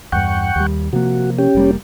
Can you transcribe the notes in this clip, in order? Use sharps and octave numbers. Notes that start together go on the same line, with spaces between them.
E2 G2 F#5 G5 C#6
D#2 G3
C3 F3 A#3 F#4
C#4 G4
F1 G3 A#3